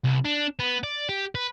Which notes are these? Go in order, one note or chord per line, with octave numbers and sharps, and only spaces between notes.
C2
D4
B3
D5
G4
B4